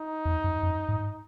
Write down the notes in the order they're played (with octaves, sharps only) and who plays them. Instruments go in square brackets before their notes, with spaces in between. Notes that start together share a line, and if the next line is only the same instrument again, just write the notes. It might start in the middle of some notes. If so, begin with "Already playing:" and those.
Already playing: [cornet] D#4
[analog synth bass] E2
F#2
F#2
G#2